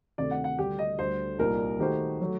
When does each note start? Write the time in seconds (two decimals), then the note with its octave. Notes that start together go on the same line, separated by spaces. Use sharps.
0.18 D2 C3 D#3 A3 D5
0.31 F#5
0.44 F#5
0.58 D2 D3 G3 G4
0.79 D#5
0.98 D2 D3 G3 C5
1.39 C2 A#2 G3 A#3 D#4 A#4
1.79 D#3 A3 D#4 F#4 G4 C5
2.21 F#3 A3